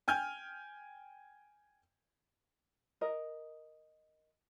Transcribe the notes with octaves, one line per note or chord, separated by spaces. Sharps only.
G5 G#5 F6 G6
A#4 D#5